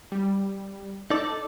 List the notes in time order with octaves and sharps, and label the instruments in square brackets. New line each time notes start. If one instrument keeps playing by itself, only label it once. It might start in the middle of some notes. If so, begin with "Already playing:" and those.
[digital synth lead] G3
[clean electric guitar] D#4 D5 [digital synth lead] A4